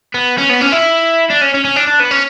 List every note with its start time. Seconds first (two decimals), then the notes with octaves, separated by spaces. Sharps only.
0.14 B3
0.38 C#4
0.49 B3
0.61 C#4
0.72 E4
1.30 D4
1.41 C#4
1.54 C#4
1.65 C#4
1.76 D4
1.87 D4
2.00 B3
2.11 C#4